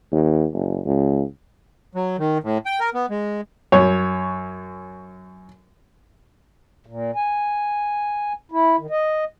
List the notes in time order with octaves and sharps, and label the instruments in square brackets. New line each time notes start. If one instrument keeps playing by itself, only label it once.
[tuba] D#2
F#1
C#2
[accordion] F#3
D#3
A2
G5
A#4
B3
G#3
[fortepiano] F#2 C#5
[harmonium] A#2
G#5
E4
D#3
D#5